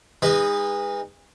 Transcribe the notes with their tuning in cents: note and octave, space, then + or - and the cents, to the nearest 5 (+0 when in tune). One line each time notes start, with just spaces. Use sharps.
G#3 -35 D#4 -5 B4 +0